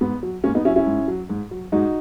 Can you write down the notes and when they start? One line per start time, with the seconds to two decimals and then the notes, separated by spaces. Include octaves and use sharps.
0.01 G#2 B3
0.23 F#3
0.44 G#2 A#3 C#4
0.55 B3 D#4
0.65 F#3 C#4 E4
0.76 C#4 E4
0.86 G#2
1.08 F#3
1.29 G#2
1.51 F#3
1.72 G#2 D#4 F#4